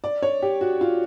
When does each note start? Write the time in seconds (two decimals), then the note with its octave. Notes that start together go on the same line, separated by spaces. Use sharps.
0.04 D5
0.22 C#5
0.42 G4
0.61 F#4
0.81 F4